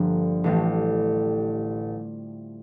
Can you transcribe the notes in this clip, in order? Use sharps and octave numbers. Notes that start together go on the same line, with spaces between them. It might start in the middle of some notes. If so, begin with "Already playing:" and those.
Already playing: G1 G2 D3 F3 A#3
A1 A2 G3